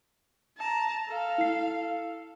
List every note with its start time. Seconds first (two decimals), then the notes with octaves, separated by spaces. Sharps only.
0.58 A5 A#5
1.08 A4 F5
1.38 E4 C7